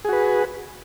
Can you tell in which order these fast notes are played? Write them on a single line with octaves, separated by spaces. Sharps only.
G#4 F#4 B4